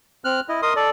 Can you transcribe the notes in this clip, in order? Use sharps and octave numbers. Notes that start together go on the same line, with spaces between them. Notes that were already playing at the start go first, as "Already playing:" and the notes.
C4 F6 F#6
E4 D#5
A#4 D#5 C6 D#6
A4 D5